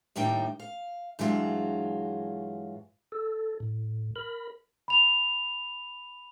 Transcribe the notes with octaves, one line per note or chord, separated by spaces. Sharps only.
D#2 A2 G3 D#4 G5
F5
G2 E3 F#3 G#3 F4 F#4
A4
A2
A#4 B5
B5 F7